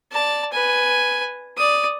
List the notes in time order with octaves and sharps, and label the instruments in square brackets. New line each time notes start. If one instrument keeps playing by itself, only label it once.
[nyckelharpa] D5 A5
B4 G#5
D5 D#6